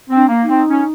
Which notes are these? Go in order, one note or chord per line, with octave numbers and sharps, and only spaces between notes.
C4
D4
A#3
D#4
C4
C#4